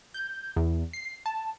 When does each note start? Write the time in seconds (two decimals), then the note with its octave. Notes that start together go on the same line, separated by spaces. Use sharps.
0.14 G6
0.56 E2
0.93 C7
1.26 A5